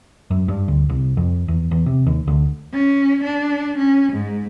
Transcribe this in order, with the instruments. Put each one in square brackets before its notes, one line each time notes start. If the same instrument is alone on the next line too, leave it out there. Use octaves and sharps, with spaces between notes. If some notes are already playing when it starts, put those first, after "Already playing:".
[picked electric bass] F#2
G2
D2
C2
F2
E2
E2
C3
D#2
D2
[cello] C#4
D4
C#4
G#2